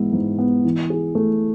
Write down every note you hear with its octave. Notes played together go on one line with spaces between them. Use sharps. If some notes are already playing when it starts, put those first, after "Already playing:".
Already playing: G#2 E3 B3 E4
G#2
B3
E3
G#4
A3